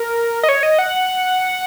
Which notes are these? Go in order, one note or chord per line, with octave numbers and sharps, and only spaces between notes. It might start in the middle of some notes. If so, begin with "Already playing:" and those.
Already playing: A#4
D#5
C#5
D#5
F#5